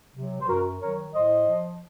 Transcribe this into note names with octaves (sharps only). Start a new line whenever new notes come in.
C3 F#3
C5
F#2 F#4 A#4
D#3 F#3 A#4 C#5
A2 C5 D#5
F3